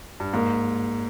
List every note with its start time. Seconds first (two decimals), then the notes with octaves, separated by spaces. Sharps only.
0.20 G2
0.33 G#2 A#3